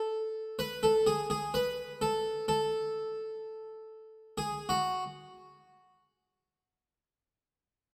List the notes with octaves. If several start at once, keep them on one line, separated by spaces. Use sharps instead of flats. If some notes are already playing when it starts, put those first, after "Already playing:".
Already playing: A4
B4
A4
G#4
G#4
B4
A4
A4
G#4
F#4